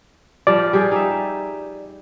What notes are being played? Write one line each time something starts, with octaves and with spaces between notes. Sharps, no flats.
F3 G3 D5
G3 G4 G#4
D#4 E5